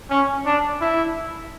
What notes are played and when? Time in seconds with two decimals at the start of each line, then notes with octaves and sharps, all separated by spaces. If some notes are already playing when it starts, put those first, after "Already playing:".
0.10 C#4
0.46 D4
0.81 E4